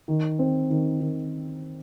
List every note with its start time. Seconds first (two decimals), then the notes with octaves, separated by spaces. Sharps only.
0.08 D#3
0.39 C4
0.70 D#3
1.00 D#3